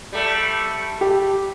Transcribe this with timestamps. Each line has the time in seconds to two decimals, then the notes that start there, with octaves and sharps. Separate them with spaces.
0.13 G3 A3
1.01 G4